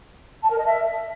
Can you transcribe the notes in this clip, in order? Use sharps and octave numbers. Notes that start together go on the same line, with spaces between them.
A5
A#4
D#5
E5